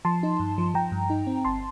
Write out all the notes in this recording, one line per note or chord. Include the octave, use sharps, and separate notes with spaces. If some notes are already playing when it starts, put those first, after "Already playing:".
F3 A5 C6
D#4
G2
F3
F3 G5 A#5
G2
D#4
C4
G1 A5 C6